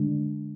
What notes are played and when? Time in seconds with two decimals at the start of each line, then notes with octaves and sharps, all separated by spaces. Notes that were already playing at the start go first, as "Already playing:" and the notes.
Already playing: D3 G#3 D4